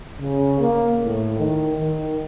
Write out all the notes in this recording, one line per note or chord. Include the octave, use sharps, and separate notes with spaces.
C#3
A#3
A2
D#3
D#3